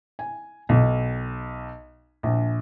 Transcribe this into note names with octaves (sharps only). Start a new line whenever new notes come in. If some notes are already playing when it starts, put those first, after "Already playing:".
G#5
B1
A#1